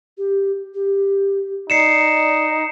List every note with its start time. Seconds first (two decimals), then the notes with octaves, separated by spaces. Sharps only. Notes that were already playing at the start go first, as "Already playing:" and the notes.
0.18 G4
0.74 G4
1.70 D#4 D5 C7 C#7 E7